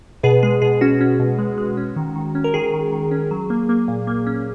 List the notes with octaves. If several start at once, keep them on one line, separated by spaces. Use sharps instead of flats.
B2 G#4 B4
G#3 G#4
B2 G#4
C#4 F#4
C#4
B2
G#3
G#3
C#4
D#3
D#3
C#4
A#4
D#3 G#4
D#3
D#3
C#4
F#3
A#3
A#3
A#2
A#3
C#4